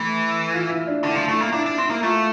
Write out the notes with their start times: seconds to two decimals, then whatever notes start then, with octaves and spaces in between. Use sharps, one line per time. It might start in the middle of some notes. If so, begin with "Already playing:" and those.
Already playing: E3 A3
0.54 F4
0.70 E4
0.87 D4
1.04 D3 E4
1.15 F3
1.28 A3 E4
1.40 A#3
1.53 D4 E4
1.66 D4 E4
1.78 C4
1.86 A#3 E4
2.03 A3 F4